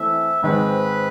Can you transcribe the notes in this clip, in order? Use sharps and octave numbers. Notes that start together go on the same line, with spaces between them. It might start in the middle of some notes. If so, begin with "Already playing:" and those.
Already playing: E3 A3 C4 E5
G#2 D#3 G#3 C4 B4